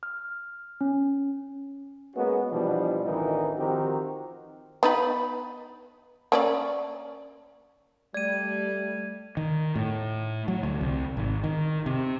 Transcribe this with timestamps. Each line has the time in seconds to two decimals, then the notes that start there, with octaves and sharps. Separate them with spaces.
0.03 F6
0.81 C#4
2.15 G#3 A#3 B3 C#4 F#4
2.51 B2 E3 F3 G3 D4
3.04 A1 D2 D#3 E3 D#4 F#4
3.58 D#3 F3 C4 F#4 G4 A#4
4.83 B3 D#4 B4
6.32 A#3 C#4 D5
8.14 G3 A3 D5 G#6 D#7
9.37 D#3
9.75 A2
10.48 F#3
10.63 D2
10.81 C2
11.17 G#1
11.44 D#3
11.86 C3